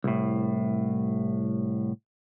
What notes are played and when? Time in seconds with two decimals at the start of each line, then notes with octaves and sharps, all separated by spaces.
0.04 C2 A2